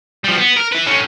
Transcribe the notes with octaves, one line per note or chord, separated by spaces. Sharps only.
F3 G3
B3
A#4
E4 B4
A2 C#4